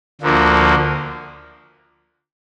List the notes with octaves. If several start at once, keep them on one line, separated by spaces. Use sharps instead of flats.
D2 D3 F3 A#3